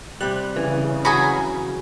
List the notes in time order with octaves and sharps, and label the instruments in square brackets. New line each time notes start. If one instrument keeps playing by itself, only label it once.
[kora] C3 G3 [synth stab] F#6
[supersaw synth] C#3 [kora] E3
[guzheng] F#3 G#4 [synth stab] G#5 A#5 B5